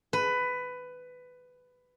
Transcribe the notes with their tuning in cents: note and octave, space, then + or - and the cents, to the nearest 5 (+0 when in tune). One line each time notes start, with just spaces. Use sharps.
B4 +15